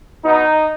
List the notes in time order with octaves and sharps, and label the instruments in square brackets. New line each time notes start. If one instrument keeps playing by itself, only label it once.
[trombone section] B2 D#4